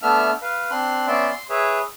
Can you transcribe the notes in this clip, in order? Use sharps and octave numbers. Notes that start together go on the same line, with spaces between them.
A3 B3 D4 E5 F6
B4 F5
C4 D4 C6 F#6
B3 C#4 D5 E5 C6
C6
G#4 B4 C#5 E5